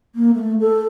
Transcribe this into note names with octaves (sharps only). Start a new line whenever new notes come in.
A#3
A3
A4